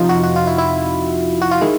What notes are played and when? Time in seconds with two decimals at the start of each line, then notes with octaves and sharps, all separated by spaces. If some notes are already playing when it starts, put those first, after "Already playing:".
Already playing: F2 C3 F3 D#4 F4
0.09 F#4
0.24 F#4
0.36 F4
0.47 E4
0.58 E4
1.42 F#4
1.51 F4
1.61 D#3 G#3 E4